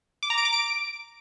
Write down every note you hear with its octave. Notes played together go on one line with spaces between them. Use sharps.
D6
A#5
D7
D6
D7